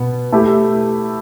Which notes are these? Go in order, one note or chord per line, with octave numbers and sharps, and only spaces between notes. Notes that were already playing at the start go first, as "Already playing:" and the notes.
Already playing: B2 B3
A3 E4 G4